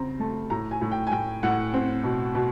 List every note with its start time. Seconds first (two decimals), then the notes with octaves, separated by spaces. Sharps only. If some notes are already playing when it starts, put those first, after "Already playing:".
Already playing: C#3 C4 A#5
0.19 A3 A5
0.50 A2 A#5
0.71 G#5
0.81 A2
0.92 G5
1.07 G#5
1.11 A2 G5
1.43 A2 F#5
1.74 C4
2.04 B2
2.35 B2